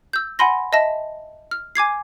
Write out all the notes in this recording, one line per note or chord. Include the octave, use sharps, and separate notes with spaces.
E6 G6
F#5 G#5 B5 C6 A#6
D#5 E5 A5 A#6
F6
G#5 D6 G#6 C7